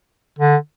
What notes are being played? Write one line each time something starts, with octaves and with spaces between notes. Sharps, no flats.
D3